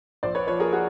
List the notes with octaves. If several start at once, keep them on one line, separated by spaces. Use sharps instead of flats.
A#1 C5 D5
B4 C#5
F3 B4 C#5
G#4 A#4
F#4 G#4